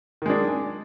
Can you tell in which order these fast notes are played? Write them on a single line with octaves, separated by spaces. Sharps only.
D#3 G#3 D4